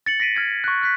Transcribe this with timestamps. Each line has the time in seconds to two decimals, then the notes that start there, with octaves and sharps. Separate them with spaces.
0.06 A6 C#7 F#7
0.20 A#6 B6 D7 D#7
0.35 F6 G#6 D#7
0.64 C#6 F#6
0.81 F6 F#6 B6